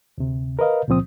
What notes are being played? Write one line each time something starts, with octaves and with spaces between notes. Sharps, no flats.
D2 C3
A#4 B4 D#5 F5
C#2 A#2 F3 C4 D#6